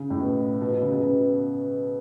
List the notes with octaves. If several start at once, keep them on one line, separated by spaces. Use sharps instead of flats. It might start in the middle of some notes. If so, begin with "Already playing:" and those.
Already playing: C#3
A2
B2
B2
B2
C#3
B2
B2